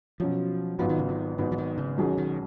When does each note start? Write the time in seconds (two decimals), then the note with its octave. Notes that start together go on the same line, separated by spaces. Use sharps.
0.20 B2 F3 F#3 C#4
0.79 G#1 G#2 F3 F#3 B3 F4
0.89 D#3
0.99 C#3
1.09 D#3
1.38 G#1 G#2 D#3 F#3 B3
1.52 F3
1.58 D#3
1.78 C#3
1.98 B1 B2 D#3 F#3 C#4 G#4
2.18 D#3